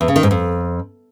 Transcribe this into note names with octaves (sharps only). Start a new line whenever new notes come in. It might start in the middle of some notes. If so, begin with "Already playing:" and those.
E2
C#3
D#3
G#2
F2